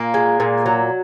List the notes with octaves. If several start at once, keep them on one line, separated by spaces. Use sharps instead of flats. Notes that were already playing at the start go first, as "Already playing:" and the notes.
Already playing: A#2 A#3
G#3
A#2
F#3